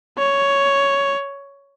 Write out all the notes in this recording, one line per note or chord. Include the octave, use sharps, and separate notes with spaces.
C#5